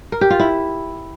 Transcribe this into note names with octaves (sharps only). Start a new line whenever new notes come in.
A#4
G4
F4
E4